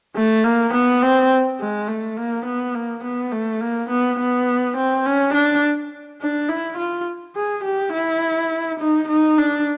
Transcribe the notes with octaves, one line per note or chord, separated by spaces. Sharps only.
A3
A#3
B3
C4
G#3
A3
A#3
B3
A#3
B3
A3
A#3
B3
B3
C4
C#4
D4
D4
E4
F4
G#4
G4
E4
D#4
D#4
D4